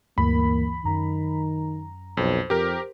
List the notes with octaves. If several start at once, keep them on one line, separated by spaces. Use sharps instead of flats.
D2 G2 E3 A#3 B5
F#2 D#3 A#5
B1 F2 C5
F2 G4 A#4